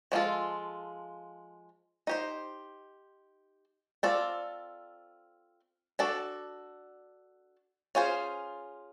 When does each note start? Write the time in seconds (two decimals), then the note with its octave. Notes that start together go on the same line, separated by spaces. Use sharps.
0.12 F3 G#3 C#4 F4 A4
2.07 D#4 G4 C5
4.03 C4 F4 A4 D5
5.99 D4 F#4 A4 D5
7.95 C#4 F4 G#4 C5